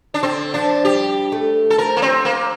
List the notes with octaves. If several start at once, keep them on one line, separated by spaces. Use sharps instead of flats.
D4
D3 C4
F3 D4
G3 G4
A3
A4
F3 A#4
A#3
C4
A#3